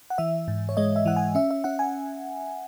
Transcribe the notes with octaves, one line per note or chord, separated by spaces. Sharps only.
F#5
E3 E5
G#2
C#5
G#3 D#5
E5
E3 F#5
G#5
C#4 E5
E5
C#4 F#5
G#5